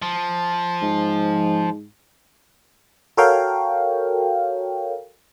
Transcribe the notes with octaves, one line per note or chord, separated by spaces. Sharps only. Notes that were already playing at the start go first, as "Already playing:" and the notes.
F3
G#2
F#4 A4 A#4 C#5 F5 G5